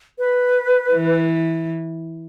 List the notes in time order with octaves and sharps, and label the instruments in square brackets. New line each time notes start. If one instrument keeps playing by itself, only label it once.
[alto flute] B4
[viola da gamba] E3